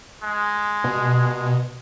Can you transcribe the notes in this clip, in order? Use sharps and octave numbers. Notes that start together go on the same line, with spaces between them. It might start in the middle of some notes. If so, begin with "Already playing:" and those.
G#3
B2